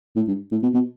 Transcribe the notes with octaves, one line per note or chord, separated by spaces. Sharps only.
A2
G2
A2
B2
B2